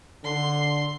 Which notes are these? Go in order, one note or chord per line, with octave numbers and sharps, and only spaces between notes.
D3 C6